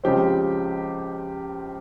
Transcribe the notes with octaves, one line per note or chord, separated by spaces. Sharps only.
C#2 C#3 F3 C4 G4